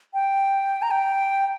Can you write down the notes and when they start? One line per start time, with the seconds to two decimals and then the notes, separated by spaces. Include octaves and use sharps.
0.14 G5
0.82 A#5
0.91 G5